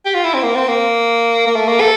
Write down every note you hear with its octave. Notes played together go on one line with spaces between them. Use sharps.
G4
F4
E4
C4
A#3
C4
A#3
A#3
A3
A#3
A4